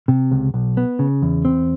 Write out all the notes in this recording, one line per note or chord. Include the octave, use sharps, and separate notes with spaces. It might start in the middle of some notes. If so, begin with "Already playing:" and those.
C3
C#2
B1
B3
C#3
E2
C4